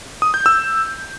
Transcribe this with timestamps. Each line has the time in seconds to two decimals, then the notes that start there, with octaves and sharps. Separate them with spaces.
0.22 D#6
0.34 G6
0.46 E6